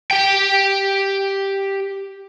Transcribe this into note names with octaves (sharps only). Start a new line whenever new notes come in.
G4 G5